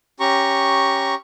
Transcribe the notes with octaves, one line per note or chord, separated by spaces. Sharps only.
C#4 G4 A#5 C#6